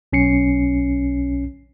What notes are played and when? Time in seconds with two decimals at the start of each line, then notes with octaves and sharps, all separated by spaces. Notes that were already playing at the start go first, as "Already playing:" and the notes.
0.13 B1 C#4 C7 C#7